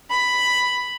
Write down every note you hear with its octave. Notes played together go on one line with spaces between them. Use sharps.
B5